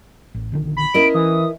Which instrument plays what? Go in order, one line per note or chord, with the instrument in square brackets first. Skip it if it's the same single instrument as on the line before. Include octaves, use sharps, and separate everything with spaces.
[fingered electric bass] A1
A#1 D3 D#3
[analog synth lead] B5
[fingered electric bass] B3 C#4 [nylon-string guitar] E4 A#4 D#5 [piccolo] D7
[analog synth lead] E3 [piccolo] D#6